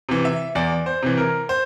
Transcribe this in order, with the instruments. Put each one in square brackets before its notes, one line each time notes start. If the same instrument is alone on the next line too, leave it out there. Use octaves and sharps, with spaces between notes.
[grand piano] C3 E3
E5
E2 D5
C5
C3 E3
A#4
C5